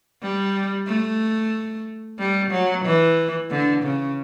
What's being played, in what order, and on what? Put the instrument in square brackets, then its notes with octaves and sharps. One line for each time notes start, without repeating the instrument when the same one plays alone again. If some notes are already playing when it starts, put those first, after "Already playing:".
[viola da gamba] G3
A3
G3
F#3
E3
D3
C#3